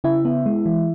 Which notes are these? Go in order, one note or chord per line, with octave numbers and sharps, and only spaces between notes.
C#3 E4 E5
B3
G#3
E3